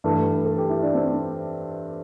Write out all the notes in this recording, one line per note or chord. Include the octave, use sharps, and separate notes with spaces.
G2 E3 A3
A4
G4
E4
D4
C4